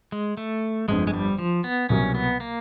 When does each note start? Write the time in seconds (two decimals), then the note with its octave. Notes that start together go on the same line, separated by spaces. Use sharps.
0.12 G#3
0.37 A3
0.88 G1 F2 D3 G#3
1.07 G#3
1.14 G3
1.38 F3
1.64 B3
1.89 C2 B2 F#3 A#3 C#4
2.15 B3
2.40 A#3